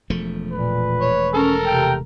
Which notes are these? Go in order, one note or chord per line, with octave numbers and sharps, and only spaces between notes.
E1 F3 A3
A#2 B4
C#5
C#4 A4 A#4 A#5
C3 G5